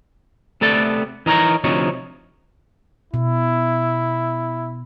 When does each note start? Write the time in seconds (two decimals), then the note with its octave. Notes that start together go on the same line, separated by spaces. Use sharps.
0.61 C3 A3 B3 A4 D5 A5
1.26 E3 D#4 A#4 C#5 A#5
1.64 D2 C3 F3 D#4 C#5
3.14 B2 E4